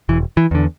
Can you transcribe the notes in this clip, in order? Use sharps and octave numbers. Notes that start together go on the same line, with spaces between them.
E1 E3
E3
E2 D3